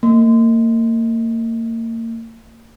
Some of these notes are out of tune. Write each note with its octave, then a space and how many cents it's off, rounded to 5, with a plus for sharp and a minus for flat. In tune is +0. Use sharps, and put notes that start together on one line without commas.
A#3 -35